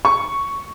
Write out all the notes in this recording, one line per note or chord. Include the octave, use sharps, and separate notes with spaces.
C#6